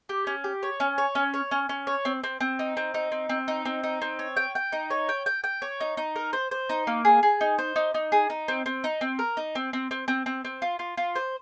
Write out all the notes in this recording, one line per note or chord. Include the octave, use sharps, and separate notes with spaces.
G4
C#4
G4
C#5
C#4
C#5
C#4
C#5
C#4
C#4
C#5
C4
C4
C4
D#4
C4
D#4
C4
C4
D#4
C4
D#4
C4
C#5
G5
G5
D#4
C#5
G5
G5
G5
C#5
D#4
D#4
A#4
C5
C5
D#4
A#3
G#4
G#4
D#4
C5
D#4
D#4
G#4
D#4
C4
C4
D#4
C4
A#4
D#4
C4
C4
C4
C4
C4
C4
F4
F4
F4
C5